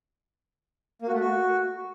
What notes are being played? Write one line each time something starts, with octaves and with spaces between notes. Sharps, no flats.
A#3
F#4
A3
F#4